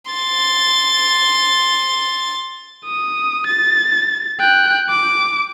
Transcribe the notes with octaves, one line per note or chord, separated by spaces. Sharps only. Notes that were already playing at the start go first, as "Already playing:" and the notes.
C6 A6
D#6
A6
G5 F#6
D6